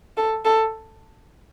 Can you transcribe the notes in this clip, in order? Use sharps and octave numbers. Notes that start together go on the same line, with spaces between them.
A4
A4